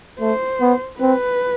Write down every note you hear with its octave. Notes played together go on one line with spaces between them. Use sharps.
A3 C5
B3
C4 B4